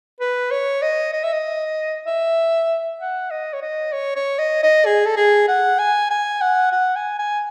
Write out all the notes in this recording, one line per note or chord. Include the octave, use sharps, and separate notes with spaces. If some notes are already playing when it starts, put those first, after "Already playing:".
B4
C#5
D#5
D#5
E5
D#5
E5
F#5
D#5
C#5
D#5
C#5
C#5
D#5
D#5
G#4
A4
G#4
F#5
G#5
G#5
F#5
F#5
G#5
G#5